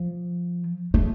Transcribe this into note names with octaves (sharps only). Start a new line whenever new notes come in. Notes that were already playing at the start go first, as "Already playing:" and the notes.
Already playing: F3
A3